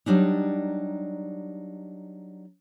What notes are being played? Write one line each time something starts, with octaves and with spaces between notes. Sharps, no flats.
F#3 G3 D4 D#4